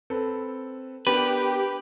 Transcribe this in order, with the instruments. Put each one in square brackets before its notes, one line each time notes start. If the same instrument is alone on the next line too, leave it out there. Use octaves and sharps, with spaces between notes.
[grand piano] C4 A4 B4
[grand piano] B3 D4 A#4 [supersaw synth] G4 [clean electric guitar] B4